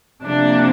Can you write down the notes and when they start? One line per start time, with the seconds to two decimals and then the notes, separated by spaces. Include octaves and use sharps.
0.22 C3 F3 A#3 D4